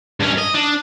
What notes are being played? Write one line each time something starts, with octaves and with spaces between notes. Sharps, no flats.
G2 C#4
D#5
D4